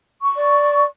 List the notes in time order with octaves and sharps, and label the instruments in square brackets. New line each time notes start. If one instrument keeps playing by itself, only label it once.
[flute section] C#6
[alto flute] D5